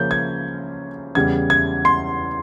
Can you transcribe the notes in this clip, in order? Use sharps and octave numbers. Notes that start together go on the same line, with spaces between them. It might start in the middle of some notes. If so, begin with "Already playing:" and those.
Already playing: C#3 F3 A#3 C#4 G6
G#6
E2 C#3 G3 G#6
G#6
C6